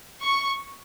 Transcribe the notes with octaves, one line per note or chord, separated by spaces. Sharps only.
C#6